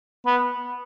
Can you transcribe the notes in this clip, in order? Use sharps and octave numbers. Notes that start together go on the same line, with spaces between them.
B3